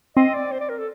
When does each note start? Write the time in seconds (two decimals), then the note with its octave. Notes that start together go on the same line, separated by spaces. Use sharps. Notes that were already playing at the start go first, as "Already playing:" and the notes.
0.16 C4 D#5
0.34 D5
0.52 C5
0.61 D5
0.69 A#4
0.78 A4